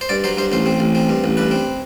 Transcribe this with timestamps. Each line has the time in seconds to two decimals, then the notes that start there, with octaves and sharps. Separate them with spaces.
0.01 C5
0.09 G2 D5
0.24 F#3 C5
0.37 G2 C5
0.52 A1 C5
0.66 C4
0.80 A1
0.95 C4
1.09 G2
1.24 A1
1.37 G2 B4
1.51 C4